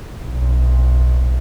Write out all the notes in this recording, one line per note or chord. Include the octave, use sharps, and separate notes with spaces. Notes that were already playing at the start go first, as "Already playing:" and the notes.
B1